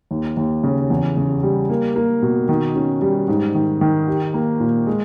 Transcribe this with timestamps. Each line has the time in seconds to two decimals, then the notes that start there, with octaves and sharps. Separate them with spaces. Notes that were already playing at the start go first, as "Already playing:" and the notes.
0.11 D#2
0.37 D#2
0.63 C#3
0.90 E2
1.17 C#3
1.43 G3
1.70 A#3
1.96 A#3
2.22 B2
2.49 D#3
2.76 C#4
3.02 G3
3.28 G#2
3.55 D#3
3.81 D#3
4.08 G4
4.34 A#3
4.60 A#2
4.87 G#3